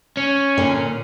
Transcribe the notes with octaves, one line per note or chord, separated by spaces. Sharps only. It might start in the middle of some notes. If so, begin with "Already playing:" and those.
C#4
A#2 D3